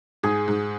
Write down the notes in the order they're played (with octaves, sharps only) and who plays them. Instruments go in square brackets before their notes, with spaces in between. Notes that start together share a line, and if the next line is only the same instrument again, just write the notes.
[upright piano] G#2 [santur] G#4
[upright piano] G#2